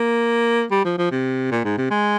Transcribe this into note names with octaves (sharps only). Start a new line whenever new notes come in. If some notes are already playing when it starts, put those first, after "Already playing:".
Already playing: A#3
G3
F3
F3
C3
A#2
G#2
C3
G#3